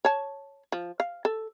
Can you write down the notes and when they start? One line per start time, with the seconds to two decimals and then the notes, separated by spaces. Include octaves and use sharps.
0.05 C#5 A5
0.72 F3
1.00 F5
1.25 A4